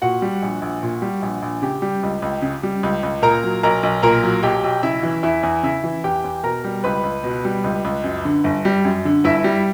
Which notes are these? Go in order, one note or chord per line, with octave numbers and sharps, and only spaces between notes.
A#2 F#4 F#5
G3
A#1
A#1
A#2
G3
A#1
A#1
C#3 G4 G5
G3
C#2
C#2
C#3
G3
C#2
C#2
A#2 A#4 A#5
F#3
B1 A#4 A#5
B1
A#2 A#4 A#5
F#3
B1 G4 G5
B1
C#3 E4 E5
E3
E2 E4 E5
E2
C#3 E4 E5
E3
E2 G4 G5
E2
B2 A#4 A#5
G3
C#2 B4 B5
C#2
B2
G3
C#2
C#2
F#2
D3
G1
G3
F#2
D3
G1 E4 E5
G3